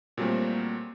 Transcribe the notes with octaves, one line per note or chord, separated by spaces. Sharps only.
A#2 F#3 G3 A3 A#3 C4